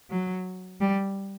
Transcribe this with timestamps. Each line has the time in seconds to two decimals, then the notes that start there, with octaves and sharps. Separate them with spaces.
0.10 F#3
0.81 G3